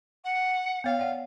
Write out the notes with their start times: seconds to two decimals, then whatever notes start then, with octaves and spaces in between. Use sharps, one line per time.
0.24 F#5
0.84 B3 C#5 F5 G5
0.99 D5 F#5